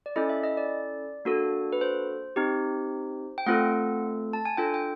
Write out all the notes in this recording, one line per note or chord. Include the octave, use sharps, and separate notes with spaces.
D5
C#4 E4 A4 D#5
E5
D#5
D5
A#3 D4 F#4 A4
B4
C5
C4 D#4 G4
G5
A3 C4 F4 A4 F#5
A5
G#5
D4 F4 A4 G5
G5